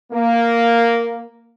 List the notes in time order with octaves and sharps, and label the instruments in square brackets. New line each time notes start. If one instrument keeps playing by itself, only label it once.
[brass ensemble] A#3